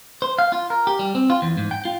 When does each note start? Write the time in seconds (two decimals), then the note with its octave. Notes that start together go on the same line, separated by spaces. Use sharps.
0.22 C5
0.39 F5
0.52 F4
0.70 A#4
0.87 G4
0.99 G3
1.15 C4
1.30 F4
1.42 E2
1.57 G#2
1.71 G5
1.85 F4